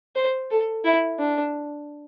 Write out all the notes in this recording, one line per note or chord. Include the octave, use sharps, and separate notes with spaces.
C5
A4
E4
D4